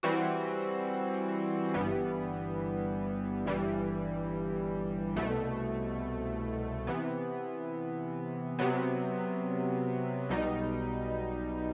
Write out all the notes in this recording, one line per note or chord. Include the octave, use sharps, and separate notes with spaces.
E3 G3 C4 F#4
G1 G2 E3 G3 B3
G1 G2 E3 G3
C2 B2 A3
C3 E3 B3
C3 F#3 B3
B1 B2 G3 D#4